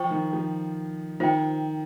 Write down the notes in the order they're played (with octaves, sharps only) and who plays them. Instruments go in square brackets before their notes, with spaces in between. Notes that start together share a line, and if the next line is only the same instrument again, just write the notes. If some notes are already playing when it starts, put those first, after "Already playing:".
Already playing: [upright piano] F3 [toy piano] C5 G5 C#6
[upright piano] D#3
F3
[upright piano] D#3 [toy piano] F4 C5 G5